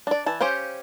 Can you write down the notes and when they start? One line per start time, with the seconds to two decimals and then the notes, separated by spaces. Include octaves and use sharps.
0.07 D4 D5
0.26 E3 A5
0.40 C#4 G4 C5 F5 G5